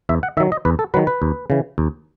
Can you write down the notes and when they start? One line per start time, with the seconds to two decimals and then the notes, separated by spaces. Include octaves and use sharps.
0.09 E2 E5
0.23 F#5
0.37 D#3 E5
0.40 F#3
0.52 D#5
0.65 E2 B4
0.79 A4
0.94 D#3 F#3 B4
1.07 B4
1.22 D#2
1.50 C#3 E3
1.78 D#2